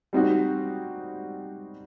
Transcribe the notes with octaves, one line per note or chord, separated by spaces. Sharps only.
G3 C4 D#4 F#4